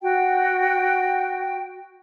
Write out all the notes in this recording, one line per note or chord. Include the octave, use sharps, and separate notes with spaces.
F#4 G5